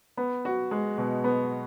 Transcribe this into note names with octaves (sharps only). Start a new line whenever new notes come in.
B3
F#4
G#3
B2
B3